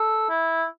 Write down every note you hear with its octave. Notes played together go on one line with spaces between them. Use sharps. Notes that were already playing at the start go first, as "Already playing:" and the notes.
Already playing: A4
E4